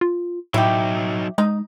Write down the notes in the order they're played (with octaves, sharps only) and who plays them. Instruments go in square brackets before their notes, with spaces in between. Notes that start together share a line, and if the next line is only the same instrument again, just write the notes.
[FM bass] F4
[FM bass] A2 [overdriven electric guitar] F#3 D#4 [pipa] E4 G4
[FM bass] G#3 [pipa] D#4